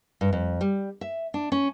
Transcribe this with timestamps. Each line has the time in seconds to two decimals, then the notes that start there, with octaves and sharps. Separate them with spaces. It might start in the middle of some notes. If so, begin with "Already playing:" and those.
0.21 G2
0.33 F2
0.61 G3
1.01 E5
1.34 D4
1.52 C#4